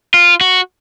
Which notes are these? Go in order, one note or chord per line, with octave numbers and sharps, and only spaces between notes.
F4
F#4